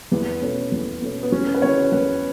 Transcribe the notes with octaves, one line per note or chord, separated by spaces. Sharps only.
E2 B3
B2 A3 C#4
E2
B2 A3 C#4
B3
E2 C#4
B4
C#3 E3 B3 F#4 C#5
E2 B4